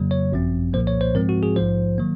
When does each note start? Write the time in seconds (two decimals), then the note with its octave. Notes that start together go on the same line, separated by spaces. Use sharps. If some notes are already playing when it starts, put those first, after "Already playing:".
Already playing: F2 C#3 F#3 A#3
0.11 C#5
0.32 G#1 F#2 F3 C4
0.73 C2 A#2 F3 A#3 C5
0.87 C#5
1.01 C5
1.15 G#2 F3 G#3 C4 A#4
1.29 F#4
1.43 G#4
1.56 A#1 G#2 F3 C5
1.98 D#3 F#3 A#3